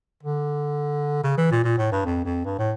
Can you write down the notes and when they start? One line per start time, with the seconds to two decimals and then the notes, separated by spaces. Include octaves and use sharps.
0.23 D3
1.23 C#3
1.38 E3
1.51 A#2
1.64 A#2
1.78 A2
1.92 G2
2.05 F2
2.25 F2
2.45 G2
2.58 A2